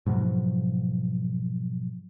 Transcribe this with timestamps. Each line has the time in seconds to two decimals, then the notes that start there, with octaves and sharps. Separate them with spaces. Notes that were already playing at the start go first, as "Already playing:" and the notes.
0.06 G#2 B2 F3 F#3